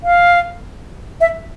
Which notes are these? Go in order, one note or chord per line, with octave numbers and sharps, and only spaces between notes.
F5
E5